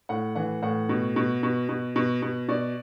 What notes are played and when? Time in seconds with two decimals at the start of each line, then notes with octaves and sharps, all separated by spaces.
0.09 A2 F#5
0.35 E3 F#5
0.63 A2 F#5
0.89 B2
1.16 B2
1.43 B2
1.69 B2
1.96 B2
2.22 B2
2.48 B2 D5